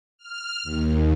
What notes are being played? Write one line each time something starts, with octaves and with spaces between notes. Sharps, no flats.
F6
D#2